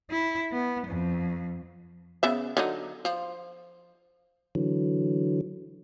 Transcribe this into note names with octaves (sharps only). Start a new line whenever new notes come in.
E4
B3
F2
C#3 B3 E5
D3 F#3 D#4
F3
D3 E3 F#3